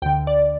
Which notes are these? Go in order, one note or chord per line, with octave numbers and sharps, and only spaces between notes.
D2 D3 G5
D5